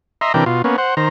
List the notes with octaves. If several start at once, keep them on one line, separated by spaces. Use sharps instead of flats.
D#5 E5 A#5 C6
C3 E3 D4 A#4 G5
B2 F4
A#3 B3 C#4
C5 F#5
D#3 C5 A#5